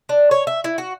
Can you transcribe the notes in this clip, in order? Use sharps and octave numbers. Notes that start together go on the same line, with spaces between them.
D4
C#5
E5
E4
F#4